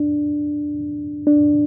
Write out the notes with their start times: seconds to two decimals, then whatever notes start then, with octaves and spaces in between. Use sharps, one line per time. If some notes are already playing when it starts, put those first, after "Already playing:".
Already playing: D4
1.27 D4